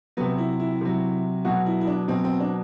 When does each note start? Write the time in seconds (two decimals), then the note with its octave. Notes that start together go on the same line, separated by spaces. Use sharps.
0.17 C3 F#3 B3
0.38 E4
0.60 E4
0.81 C3 F#3
1.45 B2 F#3 F#4
1.66 E4
1.81 E4
1.87 D4
2.08 B2 F#3 C4
2.24 C4
2.40 D4